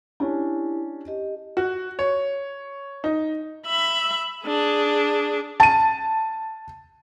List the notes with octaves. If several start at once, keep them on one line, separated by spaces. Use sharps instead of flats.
C#4 D4 E4 G4
G4 D#5
F#4
C#5
D#4
E5 B5
D4 G#4
A5 D#7